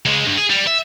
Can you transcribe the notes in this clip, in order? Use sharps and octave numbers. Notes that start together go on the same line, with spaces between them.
C#2 G#3
G2
G#4
G3
E5